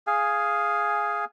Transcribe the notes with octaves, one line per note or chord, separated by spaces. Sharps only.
G#4 F5 G#5